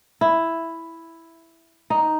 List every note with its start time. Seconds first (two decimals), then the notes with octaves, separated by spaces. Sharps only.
0.21 E4
1.90 D#4